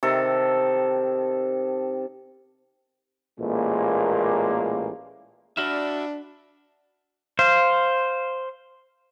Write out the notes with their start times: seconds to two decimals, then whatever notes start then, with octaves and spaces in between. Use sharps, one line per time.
0.03 C3 D#3 A4
3.39 A1 A#2 G#3 A#3
5.57 D4 F#4 D5 E5 B5 F6
7.39 C5 F5